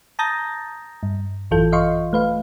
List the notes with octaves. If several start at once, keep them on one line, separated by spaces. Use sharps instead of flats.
A5 A#5 D#6 G6 A6 A#6
G2
A1 F#2 E3 F4 A4 G6
D#5 F5 C6 C#6
A3 B4 F5